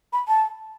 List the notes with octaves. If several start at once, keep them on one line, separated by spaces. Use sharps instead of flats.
B5
A5